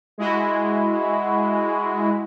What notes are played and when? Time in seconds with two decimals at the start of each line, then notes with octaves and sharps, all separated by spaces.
0.18 G#3 E4 F#4